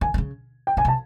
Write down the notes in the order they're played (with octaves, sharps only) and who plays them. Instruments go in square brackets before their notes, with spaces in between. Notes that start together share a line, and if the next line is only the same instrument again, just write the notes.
[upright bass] D#3 [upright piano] G#5
[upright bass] D3
C#3
[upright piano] G5
[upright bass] C#3 [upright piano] G#5
[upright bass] C3
[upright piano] A5